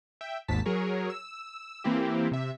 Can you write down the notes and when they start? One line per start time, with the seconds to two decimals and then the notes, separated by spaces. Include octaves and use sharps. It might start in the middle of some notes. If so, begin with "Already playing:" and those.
0.21 E5 G5
0.48 G#1 D#2 G#2 A5 B6
0.66 F#3 G#4 A#4 C#5
1.10 E6
1.84 E3 A#3 C4 E4 G4
2.32 C3 E5